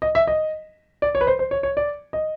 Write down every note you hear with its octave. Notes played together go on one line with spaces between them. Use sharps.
D#5
E5
D#5
D5
C#5
B4
C5
C5
C#5
C#5
D5
D#5